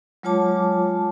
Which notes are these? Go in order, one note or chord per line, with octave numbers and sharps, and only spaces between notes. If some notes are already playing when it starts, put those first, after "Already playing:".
F#3 G#3 F4 C#5 A5 D6